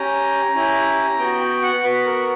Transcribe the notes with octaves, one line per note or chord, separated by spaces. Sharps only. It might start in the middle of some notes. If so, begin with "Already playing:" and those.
Already playing: C#4 G4 A#5
C#4 E4 G4
B3 F#4 G5
G5
F#5
B3 F#4 B4
A#4